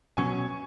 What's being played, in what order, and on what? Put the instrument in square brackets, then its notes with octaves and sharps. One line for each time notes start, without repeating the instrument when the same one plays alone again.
[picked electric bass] B2 F#3 C#4 [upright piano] G#5 C#6